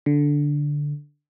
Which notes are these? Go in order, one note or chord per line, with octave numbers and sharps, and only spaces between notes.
D3